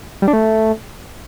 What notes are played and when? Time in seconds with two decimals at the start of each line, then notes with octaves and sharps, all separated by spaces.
0.22 G3
0.28 D4
0.33 A3